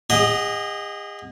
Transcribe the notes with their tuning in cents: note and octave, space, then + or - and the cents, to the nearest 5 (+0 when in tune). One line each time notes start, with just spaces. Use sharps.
G#4 -40 D#5 +0 F#5 +0